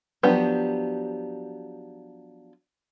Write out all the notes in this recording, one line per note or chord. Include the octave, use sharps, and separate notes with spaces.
F3 F#3 B3 D4 G4